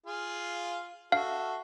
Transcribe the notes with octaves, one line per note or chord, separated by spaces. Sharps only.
F4 G#4 F5
F#4 A4 E5 F5